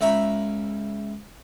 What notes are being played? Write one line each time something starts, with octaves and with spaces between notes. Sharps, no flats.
C#2 E5 A#5 B5